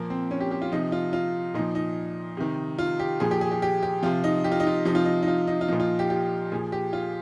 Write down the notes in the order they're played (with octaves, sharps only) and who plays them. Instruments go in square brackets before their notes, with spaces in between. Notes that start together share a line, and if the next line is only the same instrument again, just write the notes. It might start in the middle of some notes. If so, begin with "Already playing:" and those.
Already playing: [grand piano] A#2 F3 A#3
C4
C#4
G4
G4
F4
C3 F3 D#4
F4
F4
A#2 F3 D#4
D#4
C3 D#3
F4
G4
A#2 F3 G#4
G4
G#4
G4
G4
G4
C3 F3 F4
D#4
G4
F4
D#4
F4
C3 F3 D#4
F4
D#4
D#4
F4
D#4
F4
A#2 F3 D#4
F4
G4
G4
A#2 F3 G#4
G4
F4